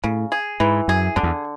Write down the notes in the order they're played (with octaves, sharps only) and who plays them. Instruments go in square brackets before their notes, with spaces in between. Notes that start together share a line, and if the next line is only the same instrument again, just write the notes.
[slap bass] A2 [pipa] C#3
[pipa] G#4
[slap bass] G#2 [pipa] E3
[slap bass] F#2 [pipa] G#4
[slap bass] F#2 [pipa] D3
[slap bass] E2